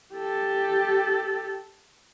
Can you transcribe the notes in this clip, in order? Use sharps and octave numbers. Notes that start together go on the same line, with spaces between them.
G4 A4